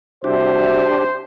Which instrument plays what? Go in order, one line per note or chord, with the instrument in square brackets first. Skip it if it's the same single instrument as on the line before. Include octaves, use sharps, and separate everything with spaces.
[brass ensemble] C2 F#4 E5 [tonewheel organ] D4 G4 [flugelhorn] C5